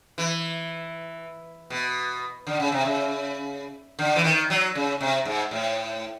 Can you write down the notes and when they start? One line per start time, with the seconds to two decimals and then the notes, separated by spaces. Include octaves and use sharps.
0.18 E3
1.70 B2
2.47 D3
2.60 C#3
2.72 C3
2.85 C#3
3.99 D3
4.16 E3
4.24 D#3
4.50 F#3
4.75 C#3
5.01 C3
5.25 G#2
5.51 A2